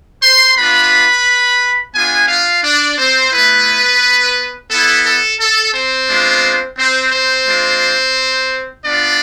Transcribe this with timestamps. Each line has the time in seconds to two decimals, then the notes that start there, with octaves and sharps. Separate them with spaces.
0.22 C5 C6
0.56 B3 D4 F4 B4 B5
1.94 B3 D4 F4 G#4 G#5
2.29 F4 F5
2.64 D4 D5
2.98 C4 C5
3.32 A3 B3 E4 B4
4.70 B3 E4 A4
5.06 A4
5.40 A4
5.74 C4 C5
6.09 G#3 B3 D4 F4
6.78 C4 C5
7.12 C4 C5
7.47 G#3 D4 F4
8.85 B3 D4 F4 D5